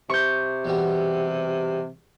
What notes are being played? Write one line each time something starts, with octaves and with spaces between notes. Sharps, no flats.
C3 C#6 G6
E2 B2 G3